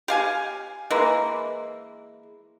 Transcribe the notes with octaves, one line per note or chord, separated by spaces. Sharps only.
G4 F5 G#5
E3 G#3 A#3